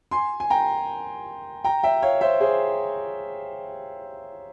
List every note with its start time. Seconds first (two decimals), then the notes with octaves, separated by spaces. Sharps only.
0.11 G#5 C6
0.40 G#5
0.50 G5 A#5
1.64 G5 A#5
1.83 E5 G5
2.02 C#5 F5
2.21 C5 E5
2.41 G#4 C5